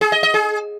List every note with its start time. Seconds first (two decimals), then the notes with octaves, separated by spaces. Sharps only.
0.01 G#4
0.12 D#5
0.23 D#5
0.34 G#4